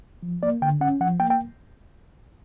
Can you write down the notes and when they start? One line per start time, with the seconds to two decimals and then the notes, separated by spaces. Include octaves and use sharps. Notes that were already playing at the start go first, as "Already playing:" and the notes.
0.22 F3
0.43 A#3 D5
0.62 D3 G5
0.81 C#4 F#5
1.00 F3 F#5
1.20 A#3 G5
1.30 G5